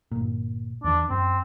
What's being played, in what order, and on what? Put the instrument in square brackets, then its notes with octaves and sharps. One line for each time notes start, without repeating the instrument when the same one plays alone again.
[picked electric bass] G1 A#2
[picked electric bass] E2 E3 [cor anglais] D4
[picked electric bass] F#2 [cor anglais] C4